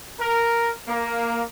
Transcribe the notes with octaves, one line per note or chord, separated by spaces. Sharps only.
A#4
A#3